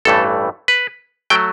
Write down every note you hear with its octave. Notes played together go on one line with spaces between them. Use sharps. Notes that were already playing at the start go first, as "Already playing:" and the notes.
A1 G2 E3 A3 A4
B4
F#3 A3 G5